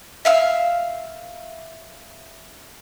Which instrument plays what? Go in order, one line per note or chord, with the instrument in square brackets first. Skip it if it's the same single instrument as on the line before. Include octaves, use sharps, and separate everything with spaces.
[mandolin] E5 F5 E6